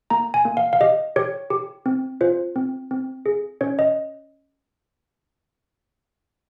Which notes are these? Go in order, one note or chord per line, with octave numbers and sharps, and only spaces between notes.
A#3 A#5
G#5
A#3
F5
F5
G4 D#5
G4 C#5
G4
C4
F4 C5
C4
C4
G#4
C#4 C#5
D#5